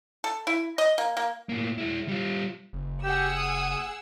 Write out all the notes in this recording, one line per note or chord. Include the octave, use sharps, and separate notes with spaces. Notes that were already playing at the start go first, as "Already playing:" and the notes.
A4
E4
D#5
A#3
A#3
A2 A#3
G#3 E4
G3 F4
F#1
G4 G#4 F#5 E6
D#6